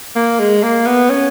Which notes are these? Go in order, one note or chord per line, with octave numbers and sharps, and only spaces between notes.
A#3
G#3
A#3
B3
C#4